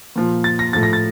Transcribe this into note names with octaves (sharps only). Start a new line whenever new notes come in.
A#2 F3
A6
A#6
A2 F3 A6
A#6
A6